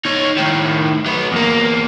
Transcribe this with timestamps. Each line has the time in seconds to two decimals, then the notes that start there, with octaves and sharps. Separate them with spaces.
0.05 D#4 C#5
0.37 A2 D#3
1.06 F#3 B3
1.32 E2 A#3